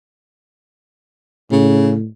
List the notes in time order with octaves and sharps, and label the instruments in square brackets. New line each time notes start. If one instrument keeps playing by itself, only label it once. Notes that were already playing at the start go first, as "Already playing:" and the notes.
[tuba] A2 [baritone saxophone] C#3